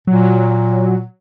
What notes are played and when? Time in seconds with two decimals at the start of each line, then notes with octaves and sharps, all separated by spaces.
0.07 A#2 F#3